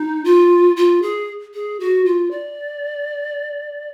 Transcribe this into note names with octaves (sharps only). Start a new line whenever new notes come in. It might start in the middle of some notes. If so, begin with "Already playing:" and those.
Already playing: D#4
F4
F4
G#4
G#4
F#4
F4
D5